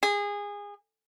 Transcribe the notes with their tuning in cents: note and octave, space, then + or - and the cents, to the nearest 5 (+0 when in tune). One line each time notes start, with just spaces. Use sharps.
G#4 -25